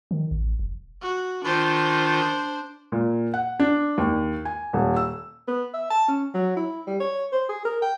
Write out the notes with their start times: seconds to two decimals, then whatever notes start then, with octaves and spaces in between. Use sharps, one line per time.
0.11 D#3
0.31 A1
0.59 F1
1.02 F#4
1.44 D#3 D4 F4 C5
2.92 A#2
3.34 F#5
3.60 D4
3.98 D#2
4.45 G#5
4.73 D#1
4.96 E6
5.48 B3
5.74 E5
5.90 A5
6.08 C#4
6.34 F#3
6.57 E4
6.87 G3
7.00 C#5
7.32 C5
7.49 G#4
7.65 A#4
7.82 G5